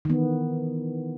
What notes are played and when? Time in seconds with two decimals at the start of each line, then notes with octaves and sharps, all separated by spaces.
0.05 D#3 E3 B3